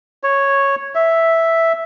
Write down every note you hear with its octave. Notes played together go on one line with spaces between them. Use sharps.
C#5
E5